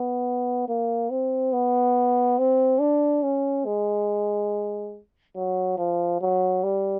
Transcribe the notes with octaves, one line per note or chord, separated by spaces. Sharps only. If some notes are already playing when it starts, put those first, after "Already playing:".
Already playing: B3
A#3
C4
B3
C4
D4
C#4
G#3
F#3
F3
F#3
G3